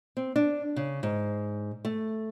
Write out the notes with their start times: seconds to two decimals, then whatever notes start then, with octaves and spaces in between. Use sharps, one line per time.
0.17 C4
0.36 D4
0.76 C#3
1.03 G#2
1.85 A3